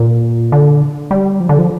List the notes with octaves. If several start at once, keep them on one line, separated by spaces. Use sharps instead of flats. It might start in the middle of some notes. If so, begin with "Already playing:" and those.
Already playing: A#2
D3
G3
F3
D3
F3